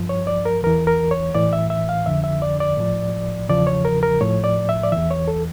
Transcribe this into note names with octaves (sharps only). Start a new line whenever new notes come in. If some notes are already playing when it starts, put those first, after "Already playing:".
Already playing: G2 F3
C#5
D5
A#4
E2 E3 A#4
A#4
C#5
A2 E3 D5
E5
E5
F5
F2 D3 F3 E5
E5
D5
D5
A2 F3
E2 C#3 F3 D5
C#5
A#4
A#4
A2 F3 C#5
D5
E5
D5
E2 E3 E5
C#5
A4